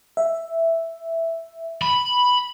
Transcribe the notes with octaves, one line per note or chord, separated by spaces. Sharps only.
E5
B5